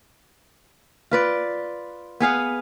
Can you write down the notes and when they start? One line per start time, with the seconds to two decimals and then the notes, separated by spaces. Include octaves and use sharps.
1.11 F4 B4 D5
2.20 B3 G#4 F5 F#5